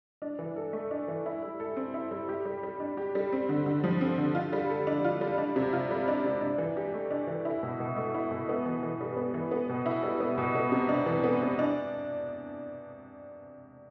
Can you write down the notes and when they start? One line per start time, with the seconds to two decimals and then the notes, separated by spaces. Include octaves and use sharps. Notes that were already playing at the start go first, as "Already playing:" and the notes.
0.22 D4
0.39 E3
0.56 A4
0.73 A3
0.91 D4
1.08 E3
1.26 E4
1.42 G3
1.60 A4
1.76 C4
1.94 E4
2.11 G3
2.29 G4
2.45 G3
2.63 G3
2.80 D4
2.97 G4
3.15 G3
3.32 C4
3.49 D3
3.66 D3
3.84 F3
4.01 C4
4.18 D3
4.35 F4
4.53 G3
4.70 A4
4.87 D4
5.04 F4
5.21 G3
5.38 D4
5.56 C3
5.73 F4
5.91 G3
6.08 D4
6.25 C3
6.41 D4
6.58 E3
6.77 G4
6.94 A3
7.11 D4
7.27 E3
7.45 E4
7.63 B2
7.80 B2
7.97 A3
8.14 E4
8.31 B2
8.49 B3
8.66 E3
8.83 E3
9.01 G3
9.17 B3
9.34 E3
9.51 B3
9.69 B2
9.86 E4
10.03 G3
10.20 B3
10.38 B2
10.55 B3
10.72 C3
10.89 D4
11.06 E3
11.24 B3
11.42 C3
11.59 D4